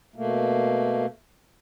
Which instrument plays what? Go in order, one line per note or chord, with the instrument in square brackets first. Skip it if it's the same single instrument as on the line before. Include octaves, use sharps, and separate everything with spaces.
[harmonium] B2 A3 A#3